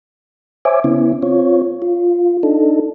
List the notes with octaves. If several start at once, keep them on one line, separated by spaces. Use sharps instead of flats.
C5 C#5 E5 G#5 D6
C#3 B3 C#4 E4
C4 F4 C#5
F4
D4 D#4 A4